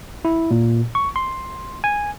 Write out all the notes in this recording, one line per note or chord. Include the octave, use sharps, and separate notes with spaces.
E4
A#2
C#6
C6
G#5